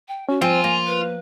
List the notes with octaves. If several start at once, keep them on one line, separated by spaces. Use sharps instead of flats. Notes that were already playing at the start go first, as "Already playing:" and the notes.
G5
C#4 F#4
F3 C4 F4 G#5
A#3
B4